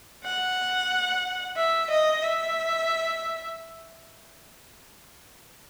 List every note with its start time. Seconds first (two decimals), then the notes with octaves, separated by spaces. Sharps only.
0.24 F#5
1.57 E5
1.90 D#5
2.23 E5